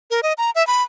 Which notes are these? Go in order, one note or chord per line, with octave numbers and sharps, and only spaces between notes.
A#4
D#5
A#5
E5
B5